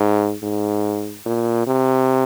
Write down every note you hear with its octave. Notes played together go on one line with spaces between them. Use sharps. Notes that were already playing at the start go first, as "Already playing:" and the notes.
Already playing: G#2
G#2
A#2
C3